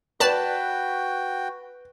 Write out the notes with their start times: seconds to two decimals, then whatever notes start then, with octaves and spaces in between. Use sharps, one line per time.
0.20 F#4 B4 D5 G5 A5